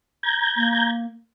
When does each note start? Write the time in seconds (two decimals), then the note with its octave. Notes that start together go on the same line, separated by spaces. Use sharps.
0.23 A#5 G6 G#6
0.57 A#3